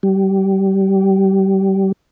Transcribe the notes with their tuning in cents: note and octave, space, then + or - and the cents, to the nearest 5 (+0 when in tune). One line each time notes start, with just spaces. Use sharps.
G3 -25